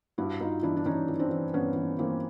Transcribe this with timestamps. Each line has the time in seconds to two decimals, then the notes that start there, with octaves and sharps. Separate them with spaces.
0.18 G2 E4 F#4
0.40 G2 D#4 F4
0.63 E3 D4 E4
0.77 D4
0.86 E3 C#4 D#4
1.09 E3
1.19 C4 D4
1.31 E3
1.54 G2 B3 C#4
1.76 E3
1.99 E3 A#3 C4